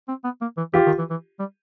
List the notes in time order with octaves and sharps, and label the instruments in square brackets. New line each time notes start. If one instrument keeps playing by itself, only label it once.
[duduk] C4
B3
A#3
E3
[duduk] E3 [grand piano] F4 G4
[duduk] D#3
E3
E3
G3